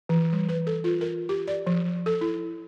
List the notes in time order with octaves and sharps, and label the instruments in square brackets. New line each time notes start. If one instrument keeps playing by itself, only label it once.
[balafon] E3
G3
B4
A4
F4
A#4
G4
D5
F3
A4
E4